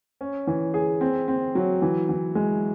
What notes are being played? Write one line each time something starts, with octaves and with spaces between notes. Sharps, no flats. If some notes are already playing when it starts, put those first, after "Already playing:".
C#4
E3
G#4
C4
C4
F#3
E3
E3
G#3